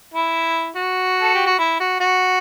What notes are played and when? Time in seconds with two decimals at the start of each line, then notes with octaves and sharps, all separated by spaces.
0.14 E4
0.75 F#4
1.22 A4
1.34 G4
1.46 F#4
1.58 E4
1.80 F#4
2.00 F#4